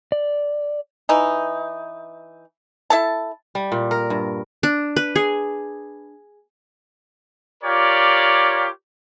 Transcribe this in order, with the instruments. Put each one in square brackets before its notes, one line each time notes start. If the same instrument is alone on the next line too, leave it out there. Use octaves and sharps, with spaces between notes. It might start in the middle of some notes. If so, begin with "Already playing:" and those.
[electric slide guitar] D5
[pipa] E3 D#4
E4 A4 A5
[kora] G3
A#2
A#4
G2
[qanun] D4
B4
G#4
[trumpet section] F4 G4 A#4 C#5 D5